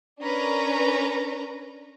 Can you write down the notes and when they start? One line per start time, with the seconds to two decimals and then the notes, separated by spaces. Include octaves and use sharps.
0.22 C#4 D4 A#4 B4 A#5